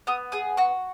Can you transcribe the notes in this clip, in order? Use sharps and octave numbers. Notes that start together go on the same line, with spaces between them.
B3 D#6
G#4 D#6
F#4 C#6